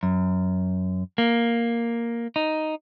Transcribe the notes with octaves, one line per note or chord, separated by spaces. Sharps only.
F#2
A#3
D#4